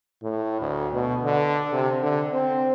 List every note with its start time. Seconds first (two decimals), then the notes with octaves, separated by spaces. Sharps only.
0.23 A2
0.61 D2
0.94 B2
1.25 D3
1.73 C3
2.03 D3
2.33 C4